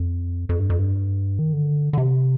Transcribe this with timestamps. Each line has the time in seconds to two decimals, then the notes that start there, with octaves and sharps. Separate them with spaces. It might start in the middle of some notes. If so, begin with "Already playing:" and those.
Already playing: F2
0.49 F2
0.60 G2
0.70 F2
0.79 G2
1.39 D#3
1.53 D3
1.93 D3
1.98 C3